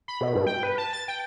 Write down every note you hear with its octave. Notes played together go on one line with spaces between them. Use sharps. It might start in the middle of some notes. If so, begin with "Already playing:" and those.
B5
B2
G2
G5
B4
A5
A6
G5